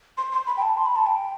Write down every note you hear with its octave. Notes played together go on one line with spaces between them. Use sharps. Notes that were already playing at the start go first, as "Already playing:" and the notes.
C6
C6
B5
G5
A5
C6
B5
A5
G5